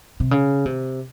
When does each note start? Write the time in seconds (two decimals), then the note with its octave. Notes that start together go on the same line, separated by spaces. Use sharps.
0.20 C3
0.31 C#3
0.66 C3